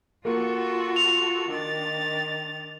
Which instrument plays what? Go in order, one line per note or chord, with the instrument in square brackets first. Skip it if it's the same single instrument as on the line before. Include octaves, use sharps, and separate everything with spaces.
[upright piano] A#3 [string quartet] F4 F#4 A4
[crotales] F7
[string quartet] D#3 D4 A6